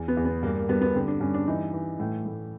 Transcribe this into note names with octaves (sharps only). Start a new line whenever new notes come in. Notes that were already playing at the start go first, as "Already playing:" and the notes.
Already playing: E2
B3
E2
B3
G2 A#3
A#3
G2 B3
B3
D3 C4
D4
G2 C#4
D4
E3 D#4
E3
A2
A2